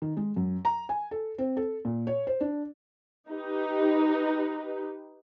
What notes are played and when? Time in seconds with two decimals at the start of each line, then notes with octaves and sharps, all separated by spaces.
0.02 D#3
0.17 G#3
0.36 F#2
0.65 A#5
0.89 G#5
1.11 A4
1.38 C4
1.57 A4
1.85 A#2
2.07 C#5
2.27 C5
2.41 D4
3.29 D#4 G4 B4